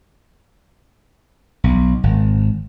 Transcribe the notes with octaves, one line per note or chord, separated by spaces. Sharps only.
B1
G#1